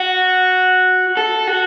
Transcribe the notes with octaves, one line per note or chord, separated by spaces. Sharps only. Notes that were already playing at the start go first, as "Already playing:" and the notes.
Already playing: F#4
A4
F#4